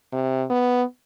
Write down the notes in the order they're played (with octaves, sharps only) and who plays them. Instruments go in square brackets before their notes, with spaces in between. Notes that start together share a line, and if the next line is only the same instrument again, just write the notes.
[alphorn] C3
B3